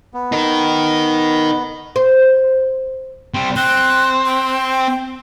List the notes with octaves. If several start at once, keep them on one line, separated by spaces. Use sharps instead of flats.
B3
D#4 A#4
C5
G3 C4
C4 F#6
G5